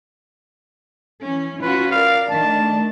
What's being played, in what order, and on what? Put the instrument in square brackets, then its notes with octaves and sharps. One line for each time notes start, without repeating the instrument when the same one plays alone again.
[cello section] E3 C#4
[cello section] C#4 F4 F#4 [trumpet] B4
[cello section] A#4 D5 [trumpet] F5
[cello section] D#3 A3 D4 [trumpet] A5